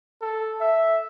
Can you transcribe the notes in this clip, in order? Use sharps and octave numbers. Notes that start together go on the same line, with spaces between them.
A4
E5